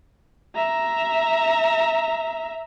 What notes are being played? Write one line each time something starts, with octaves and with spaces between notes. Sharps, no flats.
E5 A#5